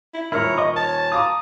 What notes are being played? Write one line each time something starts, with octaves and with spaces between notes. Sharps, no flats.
E4
D#1 E4 A#4 C#5 F6
D#5 C#6 D#6
C#5 A5
F5 A#5 D6 D#6